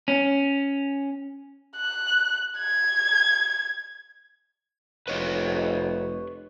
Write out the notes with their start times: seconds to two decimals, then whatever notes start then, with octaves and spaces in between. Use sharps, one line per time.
0.08 C#4
1.77 F#6
2.58 G#6
5.08 F1 B4 C#5 D#5